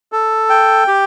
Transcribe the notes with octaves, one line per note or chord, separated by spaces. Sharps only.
A4
G5
G4